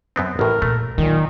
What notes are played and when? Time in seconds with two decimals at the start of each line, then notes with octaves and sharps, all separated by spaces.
0.16 F#2 B3 C4
0.39 A1 A2 A#4
0.62 A#2 A3
0.98 A#2 D#3 F#3